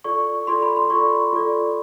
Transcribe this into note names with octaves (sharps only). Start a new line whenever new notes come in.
F4 A4 D5 C#6
F4 A4 D5 C6
B5
C6
F4 A4 D5 C#6
F4 A4 D5